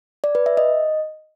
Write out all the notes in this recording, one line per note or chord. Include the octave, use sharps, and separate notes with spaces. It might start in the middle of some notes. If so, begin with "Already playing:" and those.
D5
B4
E5
D#5